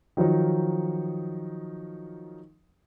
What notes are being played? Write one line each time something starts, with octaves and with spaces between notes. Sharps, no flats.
D#3 F3 F#3 D#4